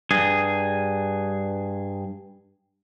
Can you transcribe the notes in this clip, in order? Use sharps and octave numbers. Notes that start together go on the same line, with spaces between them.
G2 G#4